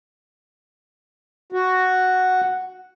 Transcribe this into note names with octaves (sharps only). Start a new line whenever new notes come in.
F#4